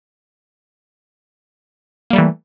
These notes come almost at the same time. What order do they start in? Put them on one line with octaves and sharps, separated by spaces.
A#3 G3 A3 E3